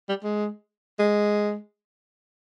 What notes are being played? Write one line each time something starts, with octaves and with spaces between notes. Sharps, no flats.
G3
G#3
G#3